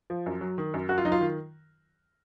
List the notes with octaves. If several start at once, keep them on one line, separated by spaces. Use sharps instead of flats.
F3
F#2
F#3
D#3
F#2
F#2 F#4
F4
F#3 D#4
F4
D#3